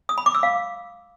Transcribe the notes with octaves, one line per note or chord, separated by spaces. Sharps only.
D#6
B5
D6
E6
F5